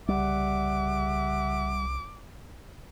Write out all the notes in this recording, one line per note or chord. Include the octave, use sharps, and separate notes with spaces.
C2 C#3 G3 E5 F#5 D6